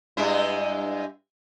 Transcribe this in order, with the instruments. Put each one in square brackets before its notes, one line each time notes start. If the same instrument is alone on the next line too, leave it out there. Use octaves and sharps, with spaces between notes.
[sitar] G2 G#3 E4